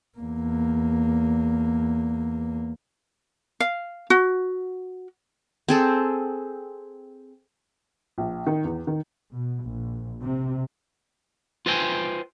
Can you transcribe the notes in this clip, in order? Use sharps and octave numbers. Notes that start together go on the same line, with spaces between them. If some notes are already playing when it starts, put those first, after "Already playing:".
E2 A#3
F5
F#4
C4 G#4 A4
A#1
D#3
E2
D#3
B2
A#1
C3
F4 B4 C5 D#5 G5 G#5